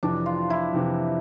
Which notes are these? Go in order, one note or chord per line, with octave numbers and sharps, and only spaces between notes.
F2 C3 E3 D4
F4
E4
F2 C3 E3